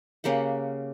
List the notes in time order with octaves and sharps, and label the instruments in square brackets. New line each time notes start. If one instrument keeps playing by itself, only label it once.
[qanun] C#3 A#3 G4 F#5